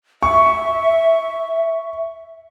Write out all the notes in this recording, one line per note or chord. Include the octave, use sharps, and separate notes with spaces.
E5 C#6